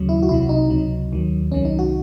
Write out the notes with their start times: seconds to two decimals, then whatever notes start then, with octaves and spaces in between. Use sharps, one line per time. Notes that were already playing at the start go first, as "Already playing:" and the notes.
Already playing: D#2 C#3 F#3
0.09 E4
0.23 F#4
0.29 C2 C3 F#3 E4
0.49 D#4
0.70 C#2 C3 F#3
1.12 D#2 D#3 F#3
1.52 C2 C3 D#3 F#3 C#4
1.65 D#4
1.79 F#4